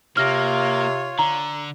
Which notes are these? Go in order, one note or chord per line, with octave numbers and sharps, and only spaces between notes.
C3 A#3 F4 C#5 F6 A#6
D3 A#5